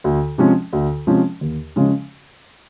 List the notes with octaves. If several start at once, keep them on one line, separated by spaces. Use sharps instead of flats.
D2
C3 F3 G#3 C#4
D2
C3 F3 G#3 C#4
D#2
C#3 F3 G#3 C#4